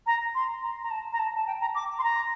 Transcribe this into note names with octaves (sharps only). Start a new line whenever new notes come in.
A#5
C6
A#5
A#5
A5
A#5
A5
A5
G5
A#5
D6
C6
A#5